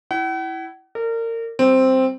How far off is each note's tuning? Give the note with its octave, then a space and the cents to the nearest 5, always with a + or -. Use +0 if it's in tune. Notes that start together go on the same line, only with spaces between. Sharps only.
E4 +0 F#5 +45
A#4 -30 D5 +10
G3 -30 C4 +0